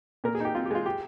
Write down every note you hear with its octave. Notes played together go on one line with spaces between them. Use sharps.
A#2 A#4
G#4
D#4 G4
C4 F4
G4
G#3 F4
G4